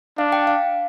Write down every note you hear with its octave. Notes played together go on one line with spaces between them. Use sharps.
D4 F5
G5
F5